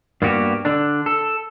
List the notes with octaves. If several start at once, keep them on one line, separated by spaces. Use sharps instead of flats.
G2 A#3 B3 F#4 G4
D3 D4
A4